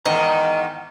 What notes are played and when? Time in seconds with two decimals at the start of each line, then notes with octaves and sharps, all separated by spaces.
0.06 E2 G#2 D#3 D#5 F#5 G5 A#5